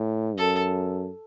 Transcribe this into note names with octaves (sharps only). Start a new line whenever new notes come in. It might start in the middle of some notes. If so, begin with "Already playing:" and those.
Already playing: A2
F#2 A4